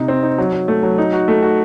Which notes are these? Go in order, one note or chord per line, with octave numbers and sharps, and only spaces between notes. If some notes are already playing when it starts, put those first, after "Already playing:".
Already playing: C3 D#4
C4
D#4
F#3
F#3
A3
F#3
D#4
F#4
A3
F#4